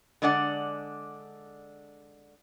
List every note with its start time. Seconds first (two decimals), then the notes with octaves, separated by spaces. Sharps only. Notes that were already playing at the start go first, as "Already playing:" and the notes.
0.22 D3 G#3 D4 D5 F#5